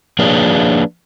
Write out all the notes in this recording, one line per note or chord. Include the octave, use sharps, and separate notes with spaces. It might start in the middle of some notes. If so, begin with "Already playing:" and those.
F3 A#3 D4 G#4 B4 C#5